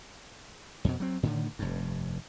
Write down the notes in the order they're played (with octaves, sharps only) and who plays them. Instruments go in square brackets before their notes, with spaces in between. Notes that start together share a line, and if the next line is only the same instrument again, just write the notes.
[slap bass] F2 B2
F#3 C4
A2 D3 D#3
F1 G2